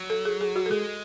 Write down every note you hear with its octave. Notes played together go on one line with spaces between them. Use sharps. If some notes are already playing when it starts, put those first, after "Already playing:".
Already playing: F#3
A4
G#4
G#4
F#4
A4
G#3 G#4